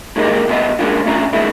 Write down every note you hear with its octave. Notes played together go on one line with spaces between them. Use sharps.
A2 D#3 G#3 A#3 D#4 G4
C2 C3 A3 B3 C4 D#5
F#3 G#3 A#3 C#4 D4 F4
B1 A3 C#4 D4 F4 A#5
A#2 D#3 G#3 A3 C4 E4